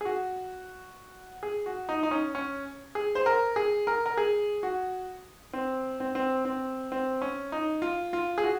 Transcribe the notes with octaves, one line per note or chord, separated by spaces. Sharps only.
G#4
F#4
G#4
F#4
D#4
D#4
C#4
C#4
G#4
C5
A#4
G#4
A#4
A#4
G#4
F#4
C4
C4
C4
C4
C4
C#4
D#4
F4
F4
G#4
F#4